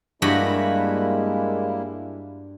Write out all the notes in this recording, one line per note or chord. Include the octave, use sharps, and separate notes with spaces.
G2 G3 G#3 A#3 E4 F#4 B5